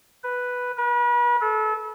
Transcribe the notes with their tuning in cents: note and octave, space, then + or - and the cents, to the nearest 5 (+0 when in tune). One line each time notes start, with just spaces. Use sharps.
B4 +0
B4 -40
A4 -30